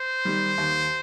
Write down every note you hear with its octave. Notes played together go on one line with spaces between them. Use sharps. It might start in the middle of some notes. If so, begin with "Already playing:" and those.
Already playing: C5
D#3 G3
D#2